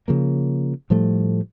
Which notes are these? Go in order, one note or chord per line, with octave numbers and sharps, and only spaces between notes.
C#3 F3 A#3
A2 F3 G3 A3